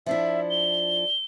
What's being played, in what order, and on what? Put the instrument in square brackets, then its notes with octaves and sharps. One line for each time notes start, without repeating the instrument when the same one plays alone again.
[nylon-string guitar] F3 D4 E4 [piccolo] E5
[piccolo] G7